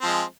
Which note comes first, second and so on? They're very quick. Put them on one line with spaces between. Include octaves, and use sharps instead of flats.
C4 F3 G#3